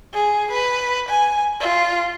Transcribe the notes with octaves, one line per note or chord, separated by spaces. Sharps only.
G#4
B4
G#5
F4